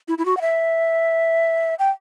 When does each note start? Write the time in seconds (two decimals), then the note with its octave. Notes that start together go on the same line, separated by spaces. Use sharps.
0.08 E4
0.18 E4
0.25 F#4
0.37 F#5
0.41 E5
1.79 G5